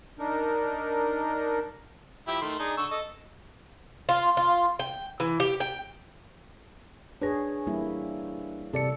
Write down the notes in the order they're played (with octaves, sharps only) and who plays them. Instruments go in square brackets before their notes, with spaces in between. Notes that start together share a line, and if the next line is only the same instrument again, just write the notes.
[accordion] D4 D#4 A#4
[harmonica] F3 E4 G4
D#3 A3 C6
D4 D#4 G#4
D3 C#6 E6
A4 D#5
[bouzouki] F4
F4
G5
E3
G4
G5
[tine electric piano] D4 B4 A#6 [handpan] G#4 C#5
[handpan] G3 A#3 E4
[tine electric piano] C3 D5 C#7 [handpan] A4